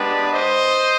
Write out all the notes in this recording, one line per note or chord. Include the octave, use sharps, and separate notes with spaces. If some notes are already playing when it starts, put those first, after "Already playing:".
Already playing: G#3 B3 D4 G4 B4 D5
C5 D#5